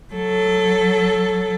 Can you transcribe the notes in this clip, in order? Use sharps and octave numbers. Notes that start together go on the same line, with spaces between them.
F#3 A4